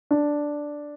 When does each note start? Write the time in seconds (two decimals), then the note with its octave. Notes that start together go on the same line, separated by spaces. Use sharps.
0.11 D4